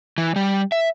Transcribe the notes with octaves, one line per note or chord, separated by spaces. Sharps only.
E3
G3
E5